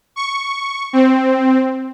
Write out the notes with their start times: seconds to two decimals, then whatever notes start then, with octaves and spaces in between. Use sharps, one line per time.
0.16 C#6
0.93 C4